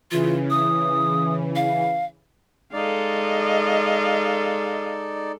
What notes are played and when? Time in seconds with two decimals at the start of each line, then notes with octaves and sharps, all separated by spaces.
0.11 C#3 E3 F4
0.50 D#6
1.56 F5
2.73 G#3 D#4 A4 D5 D#5 F5